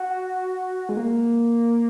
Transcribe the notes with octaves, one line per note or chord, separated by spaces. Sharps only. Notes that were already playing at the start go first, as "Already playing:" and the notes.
Already playing: F#4
G#3
A#3